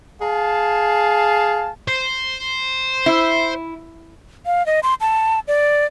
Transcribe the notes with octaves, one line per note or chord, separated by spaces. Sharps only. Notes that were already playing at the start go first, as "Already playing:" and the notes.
G#4 F5 G#5 A5
C5
E4
F5
D#5
C6
A5
D5